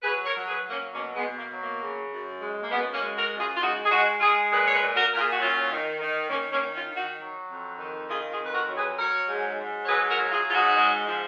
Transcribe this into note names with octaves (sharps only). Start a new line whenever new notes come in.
F#3 G#4 B4
A#4 C#5
F#3
G#4 B4
F#3
A#3 C#4
B2 A#3 C#4
G#3 B3
B2
A#3
F#3
A#3
C#3
F#2
G#3
A#3
F#2 G#3 B3
A#3 C#4
G#3
F#4 A#4
F#2
F4 G#4
F4
G#3 D#4 F#4
G#4
G#3 D#4 F#4
G#3 F4 G#4
A#2 G#4 B4
C#5
G#4 B4
A#2
F#4 A#4
A#2 A#4
F4 G#4
F#4
F#3 C#4 F4
D#3
D#3
D#3 A#3 C#4
A#3 C#4
D#3
C#4 F4
D#3
D#4 F#4
F#3
F2
D#3
D#3 F4 G#4
F4 G#4
F2
B4
F#4 A#4
F#3
G#4 B4
F#3 A#4 C#5
G#2
G#2
C#5
F#3 G#4 B4
F#4 A#4
F#3
F4 G#4
G#2 F4
D#4 F#4
G#3
F3